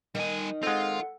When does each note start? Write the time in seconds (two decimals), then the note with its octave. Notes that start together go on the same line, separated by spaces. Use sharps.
0.15 D#3 G3 G#5
0.63 G#3 C4 F4 A4 F#5